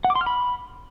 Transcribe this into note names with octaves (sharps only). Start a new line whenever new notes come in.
F#5
D6
C6
F6
B5